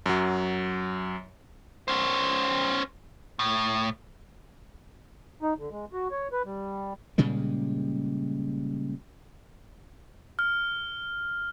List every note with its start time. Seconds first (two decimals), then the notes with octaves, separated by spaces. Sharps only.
0.06 F#2 F#3
1.88 C#4 C5
3.39 A2
5.42 D#4
5.58 D3
5.71 G#3
5.93 F#4
6.11 C#5
6.32 B4
6.45 G3
7.18 A#2 C#3 G3 G#3
10.39 F6